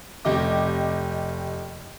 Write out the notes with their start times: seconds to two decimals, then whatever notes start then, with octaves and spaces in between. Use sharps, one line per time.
0.25 F1 G4 D#5 D6